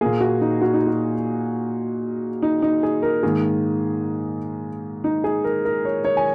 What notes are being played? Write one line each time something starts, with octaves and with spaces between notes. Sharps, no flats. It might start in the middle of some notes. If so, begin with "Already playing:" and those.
A#2 A#3 G#4
F#4
D#4
F#4
D#4
F#4
D#4
D#4
G#4
A#4
G#2 D#3 A#3 G#4
D#4
G#4
A#4
A#4
C#5
C#5
G#5